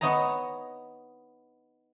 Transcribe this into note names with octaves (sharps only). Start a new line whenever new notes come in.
B3 D#4 C#5 D#5 A#5